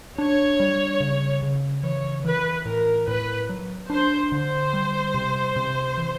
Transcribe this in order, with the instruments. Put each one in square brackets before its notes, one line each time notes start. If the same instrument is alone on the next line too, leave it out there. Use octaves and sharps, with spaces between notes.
[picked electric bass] D4 [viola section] C#5
[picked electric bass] G3
C#3
C#3
[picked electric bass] E3 [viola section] C#5
[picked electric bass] E3 [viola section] B4
[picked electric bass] A2 [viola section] A#4
[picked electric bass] A2 [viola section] B4
[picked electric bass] F#3
[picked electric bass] D4 [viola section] C5
[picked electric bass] D3 [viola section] C5
[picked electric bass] G3
C3
C3
E3